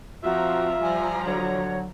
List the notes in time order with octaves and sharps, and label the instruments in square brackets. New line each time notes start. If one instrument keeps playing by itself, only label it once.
[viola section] F3 C4 A#5 [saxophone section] F4 E5 [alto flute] F#4
[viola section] F3 G3 A#5 [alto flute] G#5
[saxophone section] D3 F#3 [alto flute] C#5